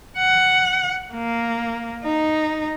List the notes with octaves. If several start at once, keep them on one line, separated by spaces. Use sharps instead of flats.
F#5
A#3
D#4